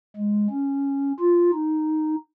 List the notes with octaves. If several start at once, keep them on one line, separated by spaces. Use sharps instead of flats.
G#3
C#4
F4
D#4